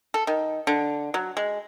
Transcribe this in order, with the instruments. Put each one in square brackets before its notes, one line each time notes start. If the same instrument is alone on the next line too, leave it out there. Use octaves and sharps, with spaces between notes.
[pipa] A4
D#3
D3
F#3
G#3